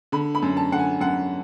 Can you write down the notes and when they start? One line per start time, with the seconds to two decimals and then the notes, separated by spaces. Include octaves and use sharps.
0.12 D3 B5
0.35 B5
0.43 F#2
0.57 A5
0.72 D3 F#5
0.79 G#5
1.01 F#2 F#5